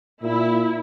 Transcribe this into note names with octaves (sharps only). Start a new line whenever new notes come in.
A#2 E4